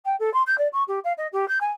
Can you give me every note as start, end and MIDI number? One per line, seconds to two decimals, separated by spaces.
0.05 0.15 79
0.19 0.32 69
0.33 0.42 84
0.46 0.58 91
0.58 0.67 74
0.72 0.83 85
0.88 0.99 67
1.04 1.12 77
1.17 1.27 75
1.32 1.47 67
1.48 1.58 91
1.60 1.71 80